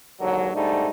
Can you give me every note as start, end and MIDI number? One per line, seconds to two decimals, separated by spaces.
0.21 0.50 39
0.21 0.50 44
0.21 0.50 50
0.21 0.50 54
0.54 0.90 44
0.54 0.90 55
0.54 0.90 57
0.54 0.90 62
0.54 0.90 63